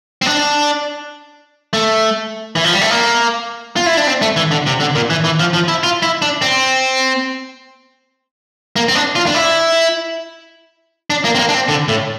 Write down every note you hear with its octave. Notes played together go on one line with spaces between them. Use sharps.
C4
D4
A3
E3
F3
G3
A3
A#3
F4
E4
D4
C4
A3
E3
D3
C3
D3
A#2
E3
E3
F3
F3
E4
F4
E4
D4
C4
A#3
C4
D4
F4
D4
E4
D4
A#3
C4
A#3
D4
C4
D3
A2